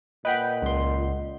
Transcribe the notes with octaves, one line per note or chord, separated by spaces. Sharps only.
A#2 B4 D#5 F#5 G5 B5
C#2 C6